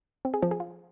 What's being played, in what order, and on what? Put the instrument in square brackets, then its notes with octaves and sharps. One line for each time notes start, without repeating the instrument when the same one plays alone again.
[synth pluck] C4
G#4
F3
G#4
F4